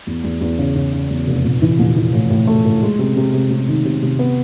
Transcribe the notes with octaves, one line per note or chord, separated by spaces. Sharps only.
E2
E2
E2
C#3
C#3
C#3
E2
F1
A#1
E3
A#1
E3
A2
A2
A3
A2
G#3
C3
C3
C3
C3
D#3
C3
C3
B3